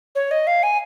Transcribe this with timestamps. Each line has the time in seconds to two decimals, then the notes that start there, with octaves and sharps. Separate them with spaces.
0.15 C#5
0.31 D#5
0.47 F5
0.63 G#5